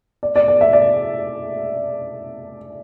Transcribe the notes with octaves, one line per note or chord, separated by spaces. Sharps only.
D5
D5
D5
E5
D5